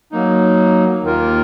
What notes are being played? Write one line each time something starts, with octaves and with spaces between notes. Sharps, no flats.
F#3 A#3 D#4
D#2 D#3 A#3 F4 A#4